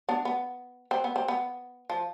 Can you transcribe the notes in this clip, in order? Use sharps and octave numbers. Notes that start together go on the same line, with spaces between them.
B3 D4
B3
C4
B3
C4
B3
F3